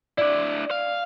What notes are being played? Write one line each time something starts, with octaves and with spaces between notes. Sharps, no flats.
D4 E4 D5
F5